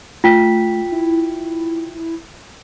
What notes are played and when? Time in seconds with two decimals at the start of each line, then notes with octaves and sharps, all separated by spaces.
0.24 A3 F4 G5 B6
0.92 E4